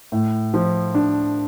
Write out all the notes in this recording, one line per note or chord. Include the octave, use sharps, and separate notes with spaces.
A2
F3
D4